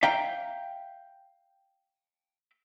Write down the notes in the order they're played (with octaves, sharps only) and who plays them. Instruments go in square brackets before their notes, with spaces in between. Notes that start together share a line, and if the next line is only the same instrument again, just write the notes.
[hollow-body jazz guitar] E5 F5 G5 A#5